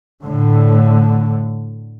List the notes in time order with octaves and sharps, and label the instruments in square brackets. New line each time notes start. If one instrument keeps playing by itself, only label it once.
[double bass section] A2 D3